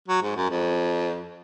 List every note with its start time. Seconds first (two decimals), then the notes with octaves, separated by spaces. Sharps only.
0.08 F#3
0.22 G#2
0.36 F#2
0.50 F2